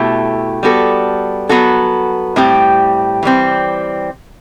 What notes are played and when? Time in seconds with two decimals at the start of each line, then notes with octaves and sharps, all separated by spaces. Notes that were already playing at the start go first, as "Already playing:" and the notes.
Already playing: B2 A3 E4 G4
0.63 G3 B3 F#4 A4
1.49 F#3 B3 F#4 A4
2.36 A2 G3 C4 G4
3.23 E3 G3 C4